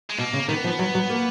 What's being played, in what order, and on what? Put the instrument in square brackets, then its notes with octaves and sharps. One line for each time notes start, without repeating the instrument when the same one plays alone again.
[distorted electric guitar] G#3
[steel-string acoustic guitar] B2 [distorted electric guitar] A#3
[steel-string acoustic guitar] C#3
[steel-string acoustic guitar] D#3 [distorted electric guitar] B3
[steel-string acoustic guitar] F3
F#3
F#3
A#3